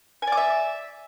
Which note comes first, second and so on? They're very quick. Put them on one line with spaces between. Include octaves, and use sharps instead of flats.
G#5 D5 D6 E5